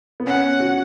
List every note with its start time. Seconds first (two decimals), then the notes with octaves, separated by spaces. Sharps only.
0.20 B3
0.27 C#4 F#5
0.60 F#4